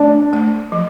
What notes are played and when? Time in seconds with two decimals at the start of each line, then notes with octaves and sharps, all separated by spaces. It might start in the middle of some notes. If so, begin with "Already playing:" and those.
Already playing: A3 D4
0.33 A3
0.72 F3